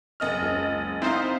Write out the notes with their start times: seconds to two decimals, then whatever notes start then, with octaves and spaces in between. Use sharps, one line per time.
0.20 F#1 D#5 F6
0.42 C#2
1.02 C4 D#4 E4 C5 F5